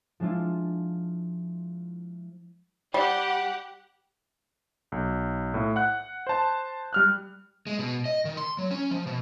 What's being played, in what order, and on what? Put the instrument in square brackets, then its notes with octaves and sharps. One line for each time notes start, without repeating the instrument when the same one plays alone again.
[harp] F3 G#3 D4 E4 F4
[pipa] G3 [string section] G4 F#5
[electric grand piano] B1
A2
F#5 F#6
C5 A5
G3 F6 F#6
[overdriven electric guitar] G#3
B2
D#5
D#3
C6
F#3
C#4
F3
B2